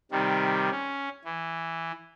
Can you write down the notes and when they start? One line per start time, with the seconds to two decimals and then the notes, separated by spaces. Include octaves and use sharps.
0.12 C3 D#3 G3
0.71 C#4
1.25 E3